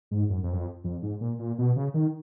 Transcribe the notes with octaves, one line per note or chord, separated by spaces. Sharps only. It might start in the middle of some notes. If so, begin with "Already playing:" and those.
G#2
F#2
F2
F#2
F2
F2
G#2
A#2
A#2
B2
C#3
D#3